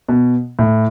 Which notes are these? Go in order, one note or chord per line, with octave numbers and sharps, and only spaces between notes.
B2
A2